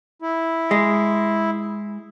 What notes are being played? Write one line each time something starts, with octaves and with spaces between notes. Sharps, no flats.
E4
G#3